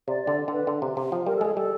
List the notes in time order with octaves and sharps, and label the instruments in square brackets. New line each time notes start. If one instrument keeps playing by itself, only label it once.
[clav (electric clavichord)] C3 [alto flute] D5
[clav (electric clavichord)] D3 [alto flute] D5
[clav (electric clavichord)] D3 [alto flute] B4
[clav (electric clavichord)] D3
C3
C3
F3
[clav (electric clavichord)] G3 [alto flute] A#4
[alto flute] A4
[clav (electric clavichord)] G#3 [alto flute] G#4
[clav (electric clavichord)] G3 [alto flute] A4